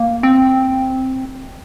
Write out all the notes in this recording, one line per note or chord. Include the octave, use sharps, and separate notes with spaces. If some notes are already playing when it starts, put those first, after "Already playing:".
Already playing: A#3
C4